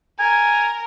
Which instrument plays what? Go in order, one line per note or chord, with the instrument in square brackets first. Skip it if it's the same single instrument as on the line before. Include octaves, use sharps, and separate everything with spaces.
[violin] A#4 [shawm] G#5